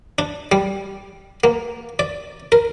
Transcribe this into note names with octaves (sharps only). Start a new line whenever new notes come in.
D4
G3
A#3
D5
A#4